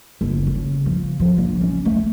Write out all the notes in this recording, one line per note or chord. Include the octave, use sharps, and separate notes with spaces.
F#1
C#3
F3
F3
A#1
C#4
A3